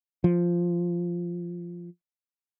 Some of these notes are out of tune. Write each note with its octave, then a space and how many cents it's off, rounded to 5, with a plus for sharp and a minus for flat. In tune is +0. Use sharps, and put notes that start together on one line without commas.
F3 -5